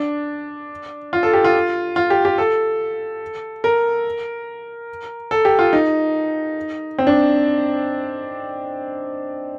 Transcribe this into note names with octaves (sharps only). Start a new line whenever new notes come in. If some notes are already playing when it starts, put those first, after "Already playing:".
Already playing: D4
F4
A4
G4
F4
F4
G4
G4
A4
A#4
A4
G4
F4
D#4
C4
D4